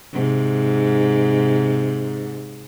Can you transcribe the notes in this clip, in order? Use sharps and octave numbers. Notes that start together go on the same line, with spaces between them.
G#2 C3